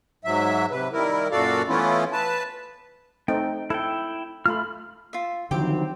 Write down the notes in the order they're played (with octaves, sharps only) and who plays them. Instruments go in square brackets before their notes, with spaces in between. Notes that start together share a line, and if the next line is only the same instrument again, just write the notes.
[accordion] G#2 F#3 E5
C3 B4
D#3 G3 E4 A#4
F#2 A#2 F#4 A4 D5 F5
E3 A3 B3 C#4 E4 F4
B4 A5
[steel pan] A3 C4 D#4 [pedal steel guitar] G5
[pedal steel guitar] E4 G5 [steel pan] A4
[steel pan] A3 F4 [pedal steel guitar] B5 F6
[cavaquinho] F4 E5
[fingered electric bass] D3 F3 [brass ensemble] D#3 F#3 C4 [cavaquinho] G4 G5